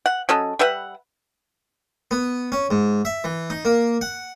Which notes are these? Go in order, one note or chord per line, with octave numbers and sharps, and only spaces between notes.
F#5
F#3 C#4 A4 D#5
G3 B4 E5 F#5
B3
C#4
G#2
E5
E3
D#4
A#3
F#5